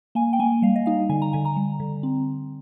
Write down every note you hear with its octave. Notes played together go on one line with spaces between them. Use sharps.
A#3 G#5
G5
A#3 G#5
G3 F5
D#5
D#4 F5
D3 G#5
A#5
D3 G#5
A#5
G3
D3
C4